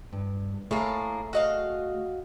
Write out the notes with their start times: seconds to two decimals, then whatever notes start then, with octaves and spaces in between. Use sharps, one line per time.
0.13 G2
0.71 A2 A3 A#3 G#4
1.33 F#4 D#5 F5